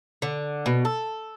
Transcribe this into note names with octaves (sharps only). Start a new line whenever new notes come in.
D3
B2
A4